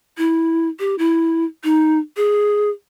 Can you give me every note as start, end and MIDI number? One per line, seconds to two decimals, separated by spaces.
0.18 0.68 64
0.79 0.95 67
0.99 1.45 64
1.64 1.98 63
2.17 2.70 68